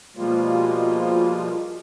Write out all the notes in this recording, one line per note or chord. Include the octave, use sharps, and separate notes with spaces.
B2 F3 G3 G#3 A#3 F4